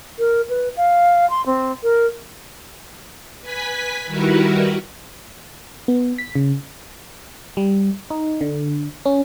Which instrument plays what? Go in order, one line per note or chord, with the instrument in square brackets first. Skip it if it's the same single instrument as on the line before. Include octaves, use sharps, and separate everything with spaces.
[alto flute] A#4
B4
F5
C6
C4
A#4
[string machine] B4 G#5 B6
D#3 G3 E4 F#4 A#4 B4
[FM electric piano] B3
B6
C#3
G3
D#4
D3
C#4